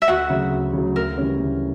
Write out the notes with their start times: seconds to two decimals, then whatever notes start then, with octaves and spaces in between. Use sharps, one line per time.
0.02 E5
0.08 D2 F#4 F#5
0.30 C#3 F#3
0.52 D2
0.73 C#3 F#3
0.95 D2 A#4
1.18 C#3 E3 G3 C#4
1.39 D2